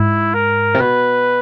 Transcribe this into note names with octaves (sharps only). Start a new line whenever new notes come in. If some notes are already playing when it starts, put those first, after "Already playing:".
Already playing: G#2 E4
A#4
C3
B2 B4